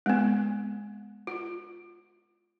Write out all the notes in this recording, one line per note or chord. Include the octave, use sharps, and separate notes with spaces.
G#3 B3
F4